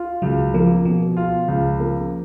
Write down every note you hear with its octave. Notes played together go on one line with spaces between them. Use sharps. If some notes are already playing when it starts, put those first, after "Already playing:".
Already playing: F4
C#2 F#3
F3 A#3
B2 F3
F4
C#2
A#3